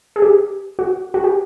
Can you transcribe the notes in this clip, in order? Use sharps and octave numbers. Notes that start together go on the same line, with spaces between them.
G#4
G4
F#4
F#4
G4